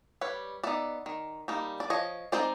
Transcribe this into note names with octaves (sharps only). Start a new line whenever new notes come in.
G3 B4 C#5
B3 D#4 D5 E5
D#3
G3 A#3 D#4
D5
F3 C#5 D#5
G#3 C4 D#4 C5 D5